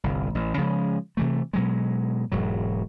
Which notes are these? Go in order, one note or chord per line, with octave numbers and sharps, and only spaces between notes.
G1 C2
A1
C#3 F3 F#3 G#3
C3 E3 A3
B2 F#3 G#3
E1 G#2 F#3